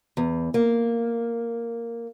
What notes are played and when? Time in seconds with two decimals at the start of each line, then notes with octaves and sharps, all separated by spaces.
0.17 E2
0.54 A#3